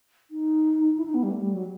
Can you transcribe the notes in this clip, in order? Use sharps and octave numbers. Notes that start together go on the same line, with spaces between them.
D#4
E4
D#4
B3
G3
A3
G3
F#3